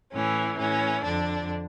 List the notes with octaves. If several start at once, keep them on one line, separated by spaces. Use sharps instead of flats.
A2 E3 C#4
A2 E3 C#4
F2 D3 D4